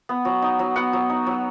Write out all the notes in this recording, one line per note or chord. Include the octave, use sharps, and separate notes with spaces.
B3
F#3
D#4
F#3
B3 F#5
F#3
D#4
F#3